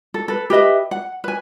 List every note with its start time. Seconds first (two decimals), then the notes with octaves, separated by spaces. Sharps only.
0.14 A4
0.28 A4 B4
0.50 G4 B4 D#5 E5
0.91 F#5
1.24 B4 G#5